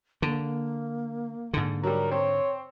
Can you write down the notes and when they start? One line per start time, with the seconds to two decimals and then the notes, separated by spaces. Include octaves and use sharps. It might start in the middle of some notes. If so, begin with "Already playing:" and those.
0.22 D3 A#3
1.54 G#2 D3
1.83 F#3 G3 A#4
2.12 C4 C#5